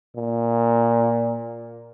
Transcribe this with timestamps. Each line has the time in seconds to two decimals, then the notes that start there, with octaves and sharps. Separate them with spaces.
0.16 A#2